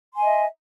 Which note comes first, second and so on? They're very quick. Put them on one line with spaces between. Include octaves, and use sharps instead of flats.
C6 G#5 D#5 E5